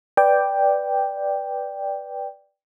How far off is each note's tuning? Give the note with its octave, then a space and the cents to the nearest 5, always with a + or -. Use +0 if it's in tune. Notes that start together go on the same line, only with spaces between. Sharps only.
B4 +0 D5 +0 G5 +5